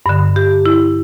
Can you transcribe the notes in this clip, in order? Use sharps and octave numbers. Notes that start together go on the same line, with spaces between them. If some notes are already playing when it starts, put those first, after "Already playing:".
G2 D3
G4
E4